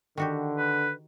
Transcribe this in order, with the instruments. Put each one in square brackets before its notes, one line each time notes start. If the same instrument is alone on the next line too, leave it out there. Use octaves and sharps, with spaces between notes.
[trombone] D3 [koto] D#3 F#4 G4
[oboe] B4